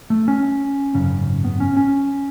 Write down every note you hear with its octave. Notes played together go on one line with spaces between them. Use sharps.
A3
C#4
G#1 F#2 C#3
B3
C#4
C#4